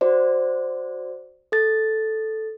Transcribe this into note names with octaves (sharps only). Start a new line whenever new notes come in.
F#4 C5 D5
A4 A6